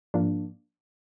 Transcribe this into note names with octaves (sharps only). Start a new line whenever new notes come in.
G#2 F3 A#3 D4